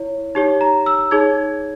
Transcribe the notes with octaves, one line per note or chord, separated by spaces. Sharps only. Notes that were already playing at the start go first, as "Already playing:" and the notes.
Already playing: E4 C#5
D#4 G4 C#5
A#5
E6
D#4 G#4 C#5 G#6